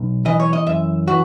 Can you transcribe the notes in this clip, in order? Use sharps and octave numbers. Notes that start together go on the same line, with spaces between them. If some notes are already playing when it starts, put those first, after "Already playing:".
Already playing: B1
E3 D#5
C#5
D#5
F#2 E5
E3 F#4